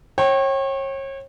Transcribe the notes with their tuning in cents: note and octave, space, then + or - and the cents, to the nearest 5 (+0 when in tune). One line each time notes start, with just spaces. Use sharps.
C#5 -35 G5 -20